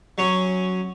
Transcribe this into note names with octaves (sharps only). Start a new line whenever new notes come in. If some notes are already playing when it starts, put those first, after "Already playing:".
F#3 C#4